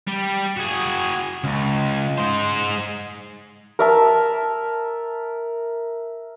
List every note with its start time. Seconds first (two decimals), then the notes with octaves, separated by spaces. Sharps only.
0.07 G3
0.57 F#4 G#4
1.44 C#2
2.18 G#3 C5
3.79 A#4 E5 A5